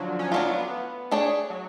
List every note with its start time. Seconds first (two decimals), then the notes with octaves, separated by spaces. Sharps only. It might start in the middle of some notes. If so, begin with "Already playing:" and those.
Already playing: D3 F3 F#3
0.19 C#4
0.32 F#3 A3 C#4 D4 F4
0.46 B3
0.59 B3
1.11 A3 D4 G#4 C#5
1.50 F#3